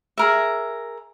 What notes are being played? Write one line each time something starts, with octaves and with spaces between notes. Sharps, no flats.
G#4 A#4 E5